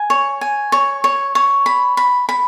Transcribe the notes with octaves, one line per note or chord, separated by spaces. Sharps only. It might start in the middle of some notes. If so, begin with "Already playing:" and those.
Already playing: G#5
C#5
G#5
C#5
C#5
C#5
B5
B5
B5